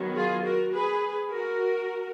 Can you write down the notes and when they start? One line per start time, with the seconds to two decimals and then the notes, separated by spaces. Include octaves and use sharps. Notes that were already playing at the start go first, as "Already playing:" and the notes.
Already playing: D#3 F#3 B3
0.16 F4 G#4
0.44 F#4 A#4
0.72 G#4 B4
1.29 F#4 A#4